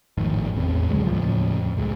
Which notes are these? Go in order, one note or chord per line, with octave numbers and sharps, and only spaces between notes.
G#1 F2 A2 D#3
A1 E2 C4
C#2 D3 F#3 G#3
D#2 A2 C#3 F3
F2
C#2 A2 F3 G#3